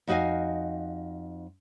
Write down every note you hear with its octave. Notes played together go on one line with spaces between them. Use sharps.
F2 D#4 F#4 D#5 F5 G#5